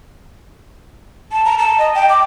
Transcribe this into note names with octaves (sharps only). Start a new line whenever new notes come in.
A5
A#5
A5
D#5
G5
D6